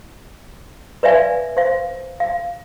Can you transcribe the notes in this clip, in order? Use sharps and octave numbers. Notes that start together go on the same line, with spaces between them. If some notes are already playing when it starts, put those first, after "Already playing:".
B4 C#5 D5 E5 F5 G#5
C5 F5
F5